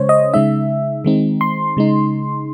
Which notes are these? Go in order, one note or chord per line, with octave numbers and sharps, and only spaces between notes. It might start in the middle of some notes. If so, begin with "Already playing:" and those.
Already playing: C#3 G#3 C#4 C5 C#5
D#5
C#3 G#3 D#4 E5
D#3 G#3 C4 D#4
C6
C#3 G#3 D#4